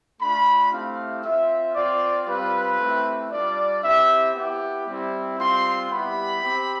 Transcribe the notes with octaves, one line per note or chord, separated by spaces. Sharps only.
A3 D4 F4 B5
A3 C4 E4 G4 F5
C4 F4 E5
C4 F4 D5
G3 C4 F4 B4
A3 C4 E4 G4
G3 D4 F4 D5
C4 E4 G4 E5
B3 E4 G4
G3 C4 E4
G3 C4 F4 C6
G3 B3 E4 G4 B5
C4 G4